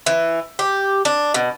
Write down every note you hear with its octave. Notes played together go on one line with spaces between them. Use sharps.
E3
G4
D4
B2